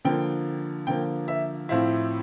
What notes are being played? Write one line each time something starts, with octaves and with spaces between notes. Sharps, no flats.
D3 F3 A#3 G5
D3 F3 A#3 G5
E5
A2 F3 C4 E4 F5